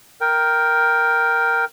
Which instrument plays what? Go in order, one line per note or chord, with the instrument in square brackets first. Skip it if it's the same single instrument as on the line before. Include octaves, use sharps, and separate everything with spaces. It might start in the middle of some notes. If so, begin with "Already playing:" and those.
[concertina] A#4 G5